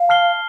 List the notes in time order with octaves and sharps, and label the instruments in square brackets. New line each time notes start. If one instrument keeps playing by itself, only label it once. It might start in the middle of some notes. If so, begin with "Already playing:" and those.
Already playing: [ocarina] F5
[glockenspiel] A5 F6 C7 G7